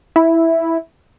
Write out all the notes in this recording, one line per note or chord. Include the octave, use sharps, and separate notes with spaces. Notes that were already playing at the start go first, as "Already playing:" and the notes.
E4